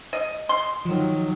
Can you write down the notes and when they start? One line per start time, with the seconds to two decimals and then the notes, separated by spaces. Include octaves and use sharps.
0.13 D#5
0.49 D#5 C6
0.85 D#3 F3 F#3